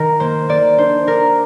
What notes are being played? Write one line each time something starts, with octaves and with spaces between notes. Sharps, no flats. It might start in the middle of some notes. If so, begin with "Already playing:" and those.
Already playing: D#3 A#4
A#3 C5
A#3 D5
D4 C5
D4 A#4